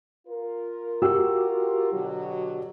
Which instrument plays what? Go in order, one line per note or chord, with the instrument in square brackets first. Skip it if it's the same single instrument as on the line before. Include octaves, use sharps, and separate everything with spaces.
[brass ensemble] F4 A#4
[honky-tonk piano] F#4 G4 E6
[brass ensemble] B2 D3 F#3